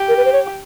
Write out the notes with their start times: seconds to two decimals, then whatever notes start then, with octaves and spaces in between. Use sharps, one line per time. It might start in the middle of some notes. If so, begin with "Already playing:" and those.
Already playing: G4
0.08 A#4
0.17 B4
0.25 C5
0.33 C#5